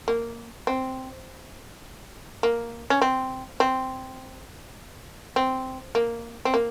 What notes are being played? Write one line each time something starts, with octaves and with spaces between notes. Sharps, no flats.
A#3
C4
A#3
C#4
C4
C4
C4
A#3
C4
A#3